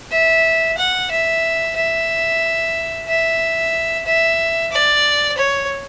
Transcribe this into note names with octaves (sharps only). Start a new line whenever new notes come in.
E5
F#5
E5
E5
E5
E5
D5
C#5